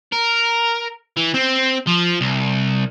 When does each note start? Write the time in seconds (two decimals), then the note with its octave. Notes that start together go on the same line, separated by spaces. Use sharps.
0.13 A#4
1.17 E3
1.34 C4
1.87 F3
2.21 C2